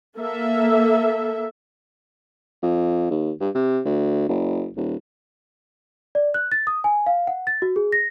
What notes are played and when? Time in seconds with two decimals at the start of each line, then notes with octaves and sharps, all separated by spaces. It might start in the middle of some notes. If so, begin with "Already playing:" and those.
0.17 A#3 A4 E5
2.62 F2
3.11 D#2
3.40 G2
3.55 C3
3.85 D2
4.29 F#1
4.76 D#1
6.15 D5
6.34 F#6
6.52 A6
6.67 D#6
6.84 G#5
7.06 F5
7.27 F#5
7.47 A6
7.62 F#4
7.76 G#4
7.92 A#6